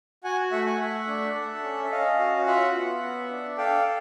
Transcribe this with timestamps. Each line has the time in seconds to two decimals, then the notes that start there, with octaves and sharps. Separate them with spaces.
0.24 F#4 F#5 G#5
0.52 A3 E5 F#5
0.66 F#5 G#5
0.80 A3 E5 F#5
1.07 D4
1.36 A4
1.64 C#4
1.84 E5
1.91 C#4 D#5 F5
2.19 F#4
2.47 F4 E5 F#5
2.75 B3
3.02 B3
3.30 D4
3.58 A4 F5 G5